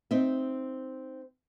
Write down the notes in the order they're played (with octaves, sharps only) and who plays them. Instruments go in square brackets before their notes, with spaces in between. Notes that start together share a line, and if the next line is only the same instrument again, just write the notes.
[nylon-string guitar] C4 D#4 E5